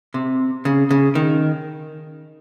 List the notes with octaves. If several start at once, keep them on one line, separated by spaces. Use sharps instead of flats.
C3
C#3
C#3
D#3